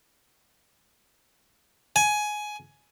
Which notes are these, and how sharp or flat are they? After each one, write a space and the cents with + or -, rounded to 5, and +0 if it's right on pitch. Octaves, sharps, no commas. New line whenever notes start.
G#5 +15